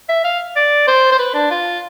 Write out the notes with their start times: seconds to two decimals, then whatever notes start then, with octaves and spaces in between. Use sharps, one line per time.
0.09 E5
0.24 F5
0.56 D5
0.87 C5
1.12 C5
1.19 B4
1.34 D4
1.50 F4